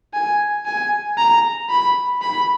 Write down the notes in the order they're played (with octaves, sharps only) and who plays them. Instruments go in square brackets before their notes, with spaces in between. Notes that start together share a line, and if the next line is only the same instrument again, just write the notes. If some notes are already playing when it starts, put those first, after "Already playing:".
[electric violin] G#5
G#5
A#5
B5
B5